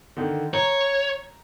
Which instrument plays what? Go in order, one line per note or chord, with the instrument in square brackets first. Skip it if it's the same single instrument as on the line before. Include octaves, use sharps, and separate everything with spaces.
[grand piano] D3 D#3
[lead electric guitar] C#5 [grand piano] A#5